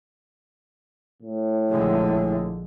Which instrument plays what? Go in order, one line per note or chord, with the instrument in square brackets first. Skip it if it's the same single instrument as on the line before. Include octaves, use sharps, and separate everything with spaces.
[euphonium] A2
[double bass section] A#1 D3 G#3